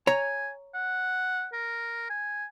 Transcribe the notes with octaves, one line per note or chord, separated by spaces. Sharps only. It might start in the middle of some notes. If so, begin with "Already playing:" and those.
C#5 G#5 A#5
F#5
A#4
G#5